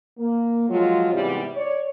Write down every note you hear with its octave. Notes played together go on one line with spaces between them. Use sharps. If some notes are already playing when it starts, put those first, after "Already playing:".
A#3
F3 F#3 G#3 F4
G#2 C3 E3 G3 B3 E4
C#5 D5